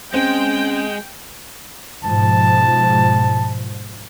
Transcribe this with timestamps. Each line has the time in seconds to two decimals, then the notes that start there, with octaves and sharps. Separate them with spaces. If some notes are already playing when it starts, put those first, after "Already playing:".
0.14 G#3 C4 C#4 G5
2.04 G#2 B2 F3 A5